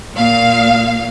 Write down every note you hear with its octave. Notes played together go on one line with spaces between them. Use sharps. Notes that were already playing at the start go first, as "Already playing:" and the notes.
A#2 F5